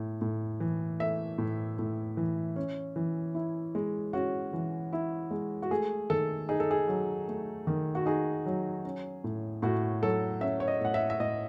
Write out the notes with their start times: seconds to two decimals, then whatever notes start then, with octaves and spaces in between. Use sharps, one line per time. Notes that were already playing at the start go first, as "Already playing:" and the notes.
Already playing: A2
0.21 A2
0.60 E3
1.00 A3 E5
1.38 A2
1.79 A2
2.17 E3
2.56 C#4
2.96 E3
3.34 E4
3.75 G#3
4.13 C#4 F#4
4.53 E3
4.93 E4
5.31 G#3
5.62 F#4
5.71 A3 G#4
6.10 D#3 A4
6.49 D#4 G#4
6.60 A4
6.71 G#4
6.88 F#3
7.28 A3
7.67 D#3
7.95 F#4
8.06 D#4 G#4
8.46 F#3
8.85 C#4
9.24 A2
9.62 A2 F#4
10.02 F#3 A4
10.41 C#4 E5
10.60 C#5
10.68 D#5
10.81 A2 F#5
10.94 E5
11.10 E5
11.20 A2 D#5